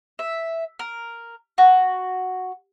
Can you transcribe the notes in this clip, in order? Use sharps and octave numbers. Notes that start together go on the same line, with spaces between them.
E5
A#4
F#4